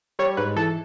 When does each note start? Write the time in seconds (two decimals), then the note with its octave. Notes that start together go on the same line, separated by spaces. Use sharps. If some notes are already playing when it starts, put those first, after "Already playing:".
0.19 G3 C#5
0.37 G#2 B4
0.56 E3 A4